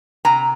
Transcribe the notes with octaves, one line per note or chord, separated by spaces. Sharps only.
C3 A#5